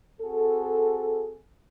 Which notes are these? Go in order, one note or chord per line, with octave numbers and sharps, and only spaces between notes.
C4 F#4 G#4 A4